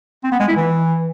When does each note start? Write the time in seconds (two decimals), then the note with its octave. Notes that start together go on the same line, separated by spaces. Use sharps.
0.24 C4
0.32 B3
0.40 G#3
0.48 E4
0.56 E3